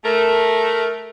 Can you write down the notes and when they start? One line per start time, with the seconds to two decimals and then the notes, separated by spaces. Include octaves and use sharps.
0.05 A3 A#4